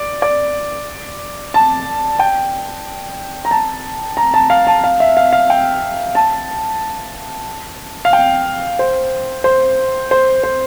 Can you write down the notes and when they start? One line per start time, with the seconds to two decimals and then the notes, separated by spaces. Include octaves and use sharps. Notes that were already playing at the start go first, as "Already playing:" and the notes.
Already playing: D5
0.22 D5
1.54 A5
2.19 G5
3.45 A#5
3.51 A5
4.17 A#5
4.34 A5
4.50 F5
4.67 A5
4.84 F5
5.00 E5
5.17 F5
5.33 F5
5.50 G5
6.15 A5
8.05 F5
8.13 G5
8.79 C5
9.44 C5
10.11 C5
10.43 C5